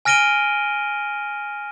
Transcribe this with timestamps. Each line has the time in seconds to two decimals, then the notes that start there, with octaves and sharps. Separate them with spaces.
0.05 G#5 F6 A#6 D7 D#7 G7